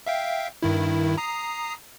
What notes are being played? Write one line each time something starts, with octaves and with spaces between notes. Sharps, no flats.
E5 F5 G5
G2 D#3 E4
A#5 D#6 C7